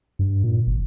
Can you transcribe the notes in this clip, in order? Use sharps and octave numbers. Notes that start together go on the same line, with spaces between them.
G2
A#2
G#1